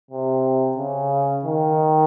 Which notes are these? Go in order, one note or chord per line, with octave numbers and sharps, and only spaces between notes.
C3
C#3
D#3